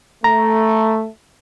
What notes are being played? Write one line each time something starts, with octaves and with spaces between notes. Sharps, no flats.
A3 A#5